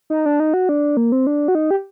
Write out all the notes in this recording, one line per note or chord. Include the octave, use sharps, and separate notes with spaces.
D#4
D4
D#4
F#4
D4
A#3
C4
D4
F#4
D#4
G4